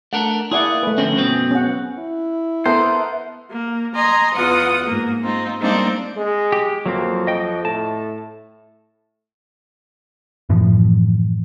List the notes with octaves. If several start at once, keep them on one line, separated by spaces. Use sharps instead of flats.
A3 D4 A#4 F#5
A#3 E4 G#4 D5 F#5
A3 B4
D3 F3 C4 C#4
F#2 B2 C4
C#4 F#5
E4
B3 A4 A#4 C5 E5
A#3
D#5 G#5 A#5 C6
E2 F4 F#5 D#6
G#2 A#3
G#3 C4 D#4 F4
G3 G#3 A#3 C4 D4 D#4
G#3
G4
F2 F#3 A#3 C4
D#5 G5
A2 A5
F#2 A2 E3 F3